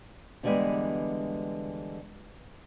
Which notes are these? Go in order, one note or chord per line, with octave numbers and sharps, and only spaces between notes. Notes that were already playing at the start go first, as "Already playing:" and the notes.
D3 E3 F3 G3 G#3 B3